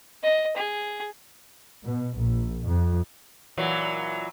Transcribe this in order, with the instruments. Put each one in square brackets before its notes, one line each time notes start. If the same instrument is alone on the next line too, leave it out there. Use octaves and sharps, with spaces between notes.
[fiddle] D#5
G#4
[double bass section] B2
A#1
F2
[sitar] A#2 E3 F#3